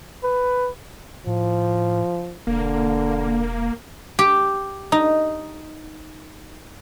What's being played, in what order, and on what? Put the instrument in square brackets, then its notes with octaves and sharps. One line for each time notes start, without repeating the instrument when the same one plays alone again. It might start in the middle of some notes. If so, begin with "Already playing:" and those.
[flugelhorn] B4
[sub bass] A2 [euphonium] F3
[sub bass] E1 [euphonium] D3 [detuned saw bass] A#3
[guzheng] G4
D#4